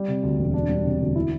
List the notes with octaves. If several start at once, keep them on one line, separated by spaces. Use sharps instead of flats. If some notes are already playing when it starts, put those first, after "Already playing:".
Already playing: G3
C3
D2
E1
D4
G3
C3
D2
E4